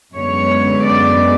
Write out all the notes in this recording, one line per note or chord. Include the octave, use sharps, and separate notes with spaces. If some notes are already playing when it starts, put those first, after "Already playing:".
F#2 D3 G#3 B3 C#5
D5